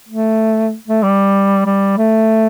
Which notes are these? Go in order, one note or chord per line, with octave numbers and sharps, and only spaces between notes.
A3
A3
G3
G3
A3